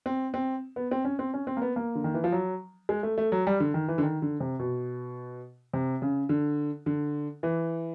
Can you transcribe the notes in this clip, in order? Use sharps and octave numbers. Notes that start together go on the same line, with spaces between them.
C4
C4
B3
C4
C#4
C4
C#4
C4
A#3
B3
A#3
D3
D#3
E3
F3
F#3
G#3
A3
A3
F#3
G3
D3
D#3
E3
D3
D#3
D3
C3
B2
C3
C#3
D3
D3
E3